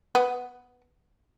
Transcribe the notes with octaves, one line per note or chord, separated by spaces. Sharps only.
B3